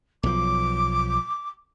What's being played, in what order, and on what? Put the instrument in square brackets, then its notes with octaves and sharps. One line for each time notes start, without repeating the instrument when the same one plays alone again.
[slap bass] B1 F3 [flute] D6